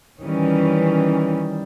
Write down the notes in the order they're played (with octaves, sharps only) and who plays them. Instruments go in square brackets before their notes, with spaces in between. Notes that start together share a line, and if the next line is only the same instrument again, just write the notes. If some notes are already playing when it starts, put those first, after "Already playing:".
[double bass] D#3 G3 [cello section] E3 C#4